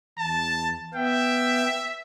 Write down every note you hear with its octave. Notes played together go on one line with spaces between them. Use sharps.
E2 A5
B3 E5 G5